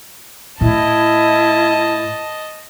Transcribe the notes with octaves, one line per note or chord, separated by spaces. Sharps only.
A2 E4 D#5 A5